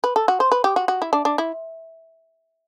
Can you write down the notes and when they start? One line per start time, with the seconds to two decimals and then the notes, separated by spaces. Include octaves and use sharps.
0.04 B4
0.16 A4
0.28 F#4
0.40 C5
0.52 B4
0.64 G4
0.76 F#4
0.88 F#4
1.02 E4
1.13 D4
1.25 D4
1.38 E4